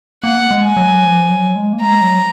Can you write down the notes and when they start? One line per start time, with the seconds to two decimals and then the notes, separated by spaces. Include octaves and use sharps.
0.23 A#3 F#5
0.51 G#3
0.63 G#5
0.77 F#3
1.03 F3
1.29 F#3
1.56 G#3
1.73 A#3
1.81 G#3 A#5
2.01 F#3